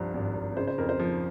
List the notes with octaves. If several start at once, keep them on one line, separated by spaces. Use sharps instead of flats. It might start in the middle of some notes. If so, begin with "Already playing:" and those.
Already playing: C2 G2 F3 C5
G#1
G#1
C#3 C5
C5
F2 A#4
C5
F3